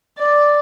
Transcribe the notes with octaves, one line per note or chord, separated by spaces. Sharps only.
D5